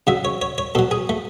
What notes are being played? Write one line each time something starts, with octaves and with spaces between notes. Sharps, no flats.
C#3 F#3 E5
C#5
C#5
C#5
B2 F#3 A4
G#4
A3